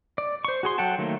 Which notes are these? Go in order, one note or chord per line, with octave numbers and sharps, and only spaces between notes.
D5
C5 C#6
F#4 G#4 C6
F#3 A4 F#5 G5 A5
D#3 F#3 A3 A#3